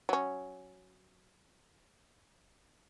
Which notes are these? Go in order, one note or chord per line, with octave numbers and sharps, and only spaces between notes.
F#3 C#4